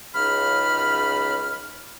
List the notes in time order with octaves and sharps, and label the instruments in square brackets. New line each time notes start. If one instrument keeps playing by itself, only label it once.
[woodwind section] C#2 F#2 C#3 D#4 B5 F6